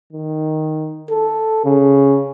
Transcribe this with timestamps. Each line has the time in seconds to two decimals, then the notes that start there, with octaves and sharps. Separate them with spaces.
0.13 D#3
1.10 A4
1.65 C#3